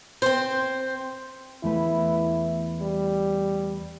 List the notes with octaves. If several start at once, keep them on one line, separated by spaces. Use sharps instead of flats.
C4 C5
E2 A3 E4 B4
G3